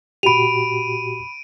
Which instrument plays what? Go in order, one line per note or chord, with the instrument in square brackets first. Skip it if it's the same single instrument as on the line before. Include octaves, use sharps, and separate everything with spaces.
[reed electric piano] A#2 F#4 G4 [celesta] B5 F7 [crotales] D7 D#7